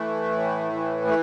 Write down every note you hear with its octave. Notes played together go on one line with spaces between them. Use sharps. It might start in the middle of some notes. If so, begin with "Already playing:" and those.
Already playing: E3 A3
A2
E3
A3